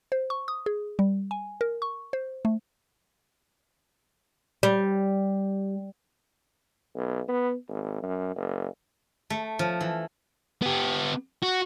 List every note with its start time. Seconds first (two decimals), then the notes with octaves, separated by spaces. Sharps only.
0.12 C5
0.30 C#6
0.48 D#6
0.66 G#4
0.99 G3
1.31 G#5
1.61 A#4
1.82 C#6
2.13 C5
2.45 A3
4.63 G3
6.96 B1
7.28 B3
7.69 G#1
8.03 F#2
8.36 F#1
9.30 A3
9.59 F3
9.81 E3
10.62 B3 G4
11.43 F#4